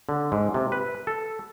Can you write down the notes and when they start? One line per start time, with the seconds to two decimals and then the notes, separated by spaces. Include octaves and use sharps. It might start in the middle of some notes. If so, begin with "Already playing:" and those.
0.09 D3
0.32 G#2
0.54 C3
0.72 B4
1.07 A4